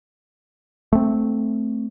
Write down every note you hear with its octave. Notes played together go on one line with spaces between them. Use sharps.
A3 C4